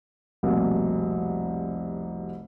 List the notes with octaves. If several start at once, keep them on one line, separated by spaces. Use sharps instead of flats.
F1 C2 B2 A#3